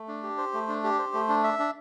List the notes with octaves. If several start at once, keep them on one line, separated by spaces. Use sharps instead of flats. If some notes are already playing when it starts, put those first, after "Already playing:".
Already playing: A3
D4
G4
C5
A3
D4
G4
C5
A3
D4
E5
D4